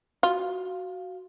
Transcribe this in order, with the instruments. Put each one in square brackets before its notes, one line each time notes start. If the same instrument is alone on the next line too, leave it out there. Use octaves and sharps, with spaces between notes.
[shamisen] F4 [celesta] F#4 F5